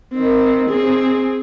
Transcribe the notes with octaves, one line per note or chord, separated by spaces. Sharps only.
D#3 C4
C4 G#4